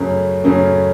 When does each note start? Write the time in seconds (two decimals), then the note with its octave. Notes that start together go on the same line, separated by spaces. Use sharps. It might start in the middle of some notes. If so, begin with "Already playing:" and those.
Already playing: F#2 C#3 A3 C#4
0.44 F#2 C#3 A3 C#4